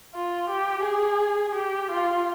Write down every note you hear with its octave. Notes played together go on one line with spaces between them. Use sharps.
F4
G4
G#4
G4
F4